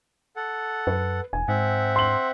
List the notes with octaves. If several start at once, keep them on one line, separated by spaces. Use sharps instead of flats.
A4 F#5
F#2 B4
E1 G#5
G#2 C4 E5 F#5
C6 F#7